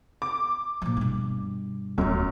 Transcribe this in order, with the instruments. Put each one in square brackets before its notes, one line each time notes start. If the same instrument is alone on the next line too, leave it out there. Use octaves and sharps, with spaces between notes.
[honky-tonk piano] D6
[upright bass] A#2 F3
G2 B2
[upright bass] D1 A3 [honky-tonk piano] F#2